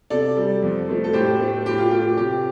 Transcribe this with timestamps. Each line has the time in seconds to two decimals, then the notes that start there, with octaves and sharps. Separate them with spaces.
0.10 C3 A4 D5
0.37 G3
0.62 F2
0.88 F3 A3
1.04 A4
1.13 A2 G4 C5
1.39 A3
1.66 A2 G4
1.78 F4
1.91 A3 G4
2.17 C3 G4